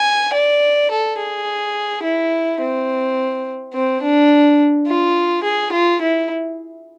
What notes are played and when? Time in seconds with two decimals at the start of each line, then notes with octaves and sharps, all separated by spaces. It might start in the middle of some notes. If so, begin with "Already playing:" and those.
Already playing: G#5
0.34 D5
0.91 A4
1.18 G#4
2.03 E4
2.61 C4
3.74 C4
4.02 D4
4.87 F4
5.43 G#4
5.72 F4
6.01 E4